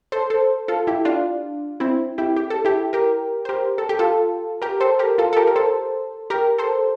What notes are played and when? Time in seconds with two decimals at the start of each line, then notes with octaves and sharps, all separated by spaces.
0.12 A4 C5
0.30 A4 C5
0.68 F4 A4
0.87 E4 G4
1.05 D4 F4
1.80 C4 E4
2.18 E4 G4
2.36 G4
2.50 A4
2.65 E4 G4
2.93 G4 A#4
3.45 C5
3.49 G4 A#4
3.78 A4
3.89 G4
3.99 F4 A4
4.62 G4 A#4
4.80 A4 C5
4.99 G4 A#4
5.18 F4 A4
5.33 A4
5.36 G4 A#4
5.47 A#4
5.56 A4 C5
6.30 G4 A#4
6.58 A4 C5